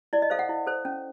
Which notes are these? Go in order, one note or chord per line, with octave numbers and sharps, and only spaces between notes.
E4 D5
D#5
A4 C5 F5
F#5
E4
A4 C5
C#4